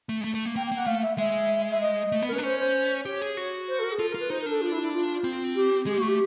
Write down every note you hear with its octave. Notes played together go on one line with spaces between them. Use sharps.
A3
G#3
A3
A3
A#3
A#3 G5
G5
A#3
F#5
A3 F5
E5
G#3 E5
E5
D#5
A3
B3
A#4
C#4
B4
D4
C#4 C5
C5
G4 C#5
G#4
F#4
C5
A4
A#4
G#4
F4 A4
A#4
F4
B4
D#4 C5
A#4
D4 A4
F4
E4
E4
F4
C4
G4
G#3 G#4
G4
A#3
A3 F#4
G4